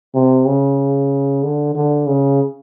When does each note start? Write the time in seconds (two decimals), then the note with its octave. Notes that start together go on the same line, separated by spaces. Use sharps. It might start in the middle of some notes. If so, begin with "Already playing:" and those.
0.15 C3
0.47 C#3
1.43 D3
1.75 D3
2.07 C#3